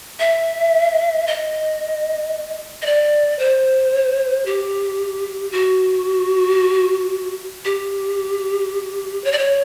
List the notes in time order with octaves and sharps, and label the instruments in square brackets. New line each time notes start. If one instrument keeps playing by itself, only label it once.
[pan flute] E5
D#5
D#5
D5
C5
G4
F#4
G4
C#5
D5
C#5